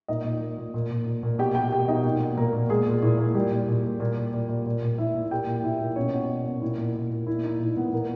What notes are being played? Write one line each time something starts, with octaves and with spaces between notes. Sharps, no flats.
A#2 D#4 D#5
A#2
A#2
A#2
A#2
A#2
A#2
A#2
B2 G4 G5
B2 G4 G5
B2 G4 G5
B2 D#4 D#5
A#2
A#2
A#2 A#3 A#4
A#2
A#2 G#3 G#4
A#2
A#2 E4
A#2
A#2 G3 G4
A#2
A#2
A#2
A#2
A#2
A#2
A#2
A#2
A#2
A#2 E4 E5
A#2
A#2 G4 G5
A#2
A#2 E4 E5
A#2
B2 C#4 C#5
B2
B2
B2
A#2 E4
A#2
A#2
A#2
A#2 E4
A#2 D#4
A#2 E4
A#2 B3 B4
A#2 A#3 A#4